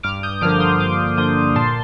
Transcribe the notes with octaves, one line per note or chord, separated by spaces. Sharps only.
G2 D6 F6
D#6 G6
D3 F3 A#3 D4 D6 F6
C6 D#6
G2 D6 F6
D3 F3 A#3 D4 D#6 G6
A#2 A5 C6